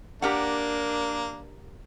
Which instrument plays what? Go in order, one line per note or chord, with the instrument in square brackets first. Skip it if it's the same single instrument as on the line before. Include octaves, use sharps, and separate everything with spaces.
[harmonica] A#3 [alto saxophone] D4 [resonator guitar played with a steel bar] G4 A#4 F#5